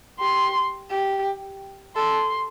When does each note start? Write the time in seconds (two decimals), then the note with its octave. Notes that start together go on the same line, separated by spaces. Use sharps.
0.20 G4 C6
0.91 G4
1.96 A4 C6